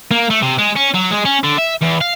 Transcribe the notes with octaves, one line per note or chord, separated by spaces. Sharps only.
A#3
A3
C3
G#3
C#4
F#3
G#3
C#4
D3
E5
E2
F5